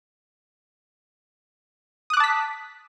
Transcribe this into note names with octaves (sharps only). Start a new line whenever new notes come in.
A5 D6 D#6 F#6 B6